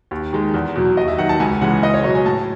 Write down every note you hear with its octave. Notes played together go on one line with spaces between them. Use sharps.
D#2
D#3 G#3
E2
B2 F#3
D#2 D#5
E5
D#3 F#3 F#5
A5
C#2 G#5
C#3 E3 G#3 F#5
C#2 D#5
C#5
B2 F#3 C#5
G#5
A2 A5